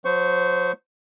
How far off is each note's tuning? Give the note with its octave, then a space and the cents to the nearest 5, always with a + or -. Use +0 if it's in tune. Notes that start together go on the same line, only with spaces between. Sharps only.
F#3 -40 C5 -20 C#6 +0